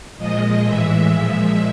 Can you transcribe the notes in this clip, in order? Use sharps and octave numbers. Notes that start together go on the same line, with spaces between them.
A#2 F3 G#3 D#5
A2 E3 G#3 E5
A#2 F3 G#3